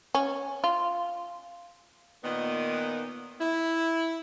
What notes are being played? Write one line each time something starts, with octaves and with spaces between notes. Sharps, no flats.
C#4
F4
A#2 D#3 B3
E4